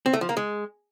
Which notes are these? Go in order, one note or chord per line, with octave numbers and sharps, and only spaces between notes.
C4
A3
F3
A#3
G#3